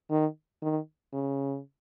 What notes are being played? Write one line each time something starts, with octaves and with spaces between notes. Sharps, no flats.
D#3
D#3
C#3